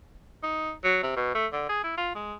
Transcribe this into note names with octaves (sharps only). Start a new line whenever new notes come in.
D#4
F#3
C3
B2
A3
D3
G#4
E4
F4
G#3